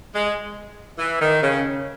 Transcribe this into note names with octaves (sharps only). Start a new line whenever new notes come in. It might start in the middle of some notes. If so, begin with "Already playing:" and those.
G#3
E3
D#3
C#3